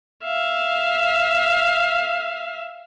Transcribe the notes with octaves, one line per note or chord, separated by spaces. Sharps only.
E5 F5